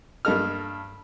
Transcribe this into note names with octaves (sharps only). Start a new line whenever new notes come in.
G2 A#3 A4 D#5 F6